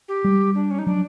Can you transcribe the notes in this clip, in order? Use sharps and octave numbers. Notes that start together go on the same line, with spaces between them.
G4
G3
D4
C#4
D#4
F#3 D4